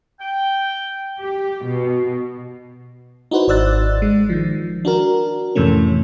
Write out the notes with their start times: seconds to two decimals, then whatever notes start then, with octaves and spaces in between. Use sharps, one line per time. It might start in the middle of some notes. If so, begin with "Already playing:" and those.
0.20 G5
1.23 G4
1.65 B2
3.31 D#4 E4 F#4 B4 C5
3.48 G#1 C5 D5 E6 F#6 A6
4.02 G#3
4.29 D#3 F3
4.85 D4 F#4 A#4
5.55 F2 A2 C3 E3 A3 C#4